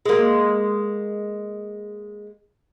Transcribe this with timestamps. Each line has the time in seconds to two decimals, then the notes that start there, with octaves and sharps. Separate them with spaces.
0.06 G#3 A#3